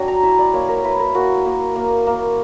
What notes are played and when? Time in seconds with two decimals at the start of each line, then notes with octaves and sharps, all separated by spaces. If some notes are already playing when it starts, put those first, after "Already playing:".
Already playing: F#3 D4 G5
0.08 A#5
0.23 E4 E5
0.38 D5
0.54 A#3 C#5
0.69 A#4
0.84 E4 B4
1.00 A#4
1.14 A#3 F#4
1.45 A#3
1.76 A#3
2.07 A#3